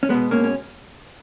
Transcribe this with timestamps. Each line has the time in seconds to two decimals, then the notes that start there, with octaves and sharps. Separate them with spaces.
0.03 C#4
0.09 B2 G#3 B3
0.31 A#3 C#4
0.44 C#4